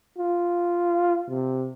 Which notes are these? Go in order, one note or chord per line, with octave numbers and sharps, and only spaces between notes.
F4
C3